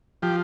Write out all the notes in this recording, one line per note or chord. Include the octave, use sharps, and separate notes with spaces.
F3 G4